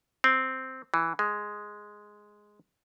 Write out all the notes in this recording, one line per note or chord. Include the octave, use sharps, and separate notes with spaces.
C4
E3
G#3